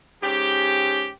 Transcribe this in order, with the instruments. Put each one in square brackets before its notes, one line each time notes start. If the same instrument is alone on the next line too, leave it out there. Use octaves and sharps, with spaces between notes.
[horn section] G#2 C#4 G4